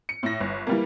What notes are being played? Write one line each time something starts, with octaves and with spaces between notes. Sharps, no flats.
C#7
A2 A#6
G1
E3 G3 A#3